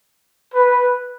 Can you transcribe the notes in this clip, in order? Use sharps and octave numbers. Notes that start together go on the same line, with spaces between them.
B4